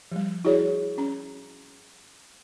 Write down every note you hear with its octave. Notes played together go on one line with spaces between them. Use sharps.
F3 G3
E4 F#4 G#4 C#5 D5
C#4 A#5